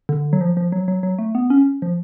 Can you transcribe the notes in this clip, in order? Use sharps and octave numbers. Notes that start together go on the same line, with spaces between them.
D3
F#3
F3
F3
F#3
F#3
F#3
A3
B3
C#4
F3